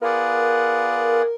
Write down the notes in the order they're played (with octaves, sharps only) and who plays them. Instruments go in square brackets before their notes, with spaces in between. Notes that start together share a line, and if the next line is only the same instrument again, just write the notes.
[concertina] B3 F4 G#4 D5 F#5 [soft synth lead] A#4